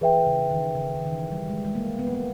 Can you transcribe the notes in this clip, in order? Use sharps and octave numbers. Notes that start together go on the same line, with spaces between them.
E3 G#4 B4 E5 G5
C#3
D#3
C#3
D#3
D#3
E3
G3
G#3
G#3
A#3
B3
A#3
B3